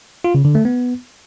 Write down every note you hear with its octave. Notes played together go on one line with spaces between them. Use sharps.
F4
C#3
D3
A3
B3